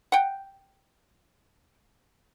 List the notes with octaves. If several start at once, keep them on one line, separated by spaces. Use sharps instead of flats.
F#5 G5